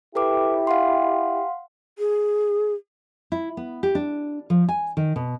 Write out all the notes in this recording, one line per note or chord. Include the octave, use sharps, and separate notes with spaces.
E4 G4 A4 B4 D6
F5 F#5 C6
G#4
E4
B3
G4
D4
F3
G#5
D#3
B2